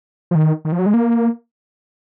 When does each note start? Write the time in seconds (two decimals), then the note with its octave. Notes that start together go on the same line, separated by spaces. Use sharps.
0.31 F3
0.35 D#3
0.65 D#3
0.72 F3
0.79 F#3
0.86 G#3
0.94 A#3